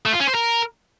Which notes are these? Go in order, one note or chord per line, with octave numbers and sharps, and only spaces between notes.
A3
F4
C#4
C5
A#4